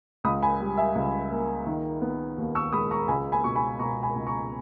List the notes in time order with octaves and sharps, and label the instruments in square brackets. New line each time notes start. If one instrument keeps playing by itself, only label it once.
[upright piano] C#2 B5 D#6
G#5 B5
G3
E5 G#5
C#2
A#3
D#3
B3
D#2
C#6 E6
G#3 B5 D#6
A#5 C#6
C#2 G#5 B5
G#5 B5
B2 C#6
G#5 B5
B2 A#5 C#6
G#5 B5
C#2
A#5 C#6